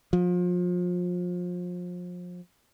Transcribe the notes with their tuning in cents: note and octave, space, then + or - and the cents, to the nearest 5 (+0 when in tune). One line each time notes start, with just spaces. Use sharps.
F3 +30